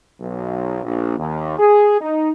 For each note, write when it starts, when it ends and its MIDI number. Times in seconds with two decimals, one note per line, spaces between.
0.20 0.83 35
0.83 1.15 34
1.18 1.57 39
1.58 1.98 68
2.00 2.31 63